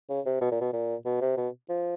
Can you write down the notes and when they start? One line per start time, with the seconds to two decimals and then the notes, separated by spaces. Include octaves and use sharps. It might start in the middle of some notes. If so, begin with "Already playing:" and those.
0.09 C#3
0.26 C3
0.41 B2
0.51 A#2
0.61 B2
0.73 A#2
1.05 B2
1.21 C3
1.37 B2
1.69 F3